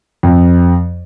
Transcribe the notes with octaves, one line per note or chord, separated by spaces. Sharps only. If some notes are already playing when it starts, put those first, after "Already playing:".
F2